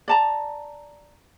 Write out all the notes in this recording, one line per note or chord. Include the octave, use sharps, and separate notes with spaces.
D5 A5 A#5